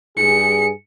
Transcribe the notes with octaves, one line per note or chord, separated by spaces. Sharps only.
G2 G#4 C#7